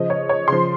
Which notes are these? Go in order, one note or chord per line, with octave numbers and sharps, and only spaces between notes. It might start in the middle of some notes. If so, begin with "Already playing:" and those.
Already playing: C#3 F3 D#5
C#5
C#5
C#3 F3 C6